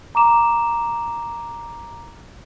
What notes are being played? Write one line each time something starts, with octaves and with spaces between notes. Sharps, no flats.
A#5 D6 E7